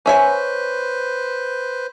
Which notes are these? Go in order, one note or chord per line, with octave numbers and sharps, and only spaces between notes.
C#4 B4 C5 E5 G#5